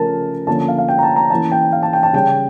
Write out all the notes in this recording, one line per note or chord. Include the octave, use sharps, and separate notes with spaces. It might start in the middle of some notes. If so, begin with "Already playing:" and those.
Already playing: C#3 F3 A3 C#4 A#4 A5
D3 F3 A#3 C#4 A5
F5
F5
G5
A#5
A5
A#5
E3 A#3 C#4 A5
G5
F5
A5
G5
A5
C#3 G3 C#4 G5